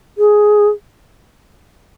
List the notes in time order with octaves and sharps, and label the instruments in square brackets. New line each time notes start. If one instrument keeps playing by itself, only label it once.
[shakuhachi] G#4